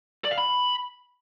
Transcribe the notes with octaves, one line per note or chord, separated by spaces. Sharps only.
D5
F5
B5